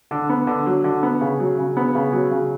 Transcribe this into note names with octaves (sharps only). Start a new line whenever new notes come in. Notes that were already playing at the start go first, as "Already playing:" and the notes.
D3
B3
D3
F#3
D3
B3
C#3
F#3
C#3
B3
C#3
F#3
C#3